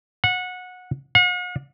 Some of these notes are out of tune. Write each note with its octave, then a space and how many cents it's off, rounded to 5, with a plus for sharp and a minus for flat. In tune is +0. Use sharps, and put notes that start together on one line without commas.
F#5 -20
F#5 -45